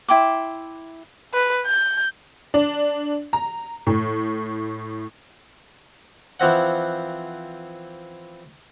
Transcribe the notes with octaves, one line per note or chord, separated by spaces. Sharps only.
E4 G5 C6 D6
B4
G6
D4
A#5
A2
E3 F3 C4 F#5